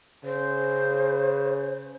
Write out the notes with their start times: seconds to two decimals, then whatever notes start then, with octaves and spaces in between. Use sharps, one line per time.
0.24 C#3 C5